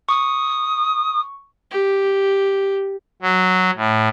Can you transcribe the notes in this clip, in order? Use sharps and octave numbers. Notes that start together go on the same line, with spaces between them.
C#6 D#6
G4
F#3
A2